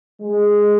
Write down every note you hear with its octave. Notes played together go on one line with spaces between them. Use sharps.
G#3